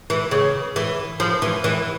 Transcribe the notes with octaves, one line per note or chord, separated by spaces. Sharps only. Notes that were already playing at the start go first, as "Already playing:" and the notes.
E3
C#3
E3
F3
E3
E3